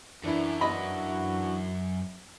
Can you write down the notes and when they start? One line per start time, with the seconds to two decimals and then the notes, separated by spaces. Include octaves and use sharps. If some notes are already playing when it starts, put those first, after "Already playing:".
0.24 F#2 E3 D4 E4
0.61 F#4 D#5 B5